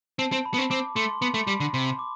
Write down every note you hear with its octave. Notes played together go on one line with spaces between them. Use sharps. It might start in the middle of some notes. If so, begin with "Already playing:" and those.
C4 A5
C4
B5
B3
C4
C4 D6
A3 C6
B3 B5
A3
G3 B5
D3
C3 C6
D6